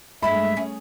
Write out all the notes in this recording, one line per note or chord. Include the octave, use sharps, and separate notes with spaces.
G2 G#3 A3 E5 B5
C#4 G#4